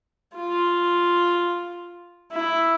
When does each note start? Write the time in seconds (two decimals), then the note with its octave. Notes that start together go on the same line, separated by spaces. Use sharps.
0.36 F4
2.32 E4